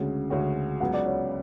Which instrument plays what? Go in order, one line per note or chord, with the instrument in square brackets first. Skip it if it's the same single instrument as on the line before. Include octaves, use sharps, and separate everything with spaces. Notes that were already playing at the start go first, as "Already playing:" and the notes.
Already playing: [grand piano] D2 C#3 G#3 C#4 F#4
D2 C#3 G#3 C#4 F#4
[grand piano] C#2 C#3 F#3 B3 [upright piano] F#5
[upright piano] D5
C#5